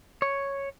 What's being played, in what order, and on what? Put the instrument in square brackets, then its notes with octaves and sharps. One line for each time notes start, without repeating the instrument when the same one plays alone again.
[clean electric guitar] C#5